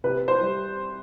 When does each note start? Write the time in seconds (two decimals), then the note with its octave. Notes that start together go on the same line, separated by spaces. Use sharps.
0.04 C3 B4
0.28 C5
0.41 G3